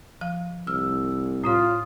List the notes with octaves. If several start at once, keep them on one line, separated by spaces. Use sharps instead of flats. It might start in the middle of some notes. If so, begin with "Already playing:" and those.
F3 F5
C2 E6 F6
A2 E4 F4 C#5 D#6